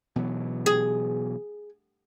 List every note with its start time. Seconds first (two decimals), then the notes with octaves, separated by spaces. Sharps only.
0.16 B2 E3 F#3
0.66 G#4